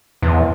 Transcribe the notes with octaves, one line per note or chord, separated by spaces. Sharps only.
E2